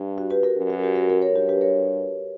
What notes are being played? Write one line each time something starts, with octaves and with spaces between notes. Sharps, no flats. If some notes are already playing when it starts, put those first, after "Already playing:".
Already playing: G2
F#4
G4 B4
F#4 A#4
F#2
F#4
G4
F#4 A#4
F#4 A#4
A#4 C#5
G2 G4
G4 B4
A#4 C#5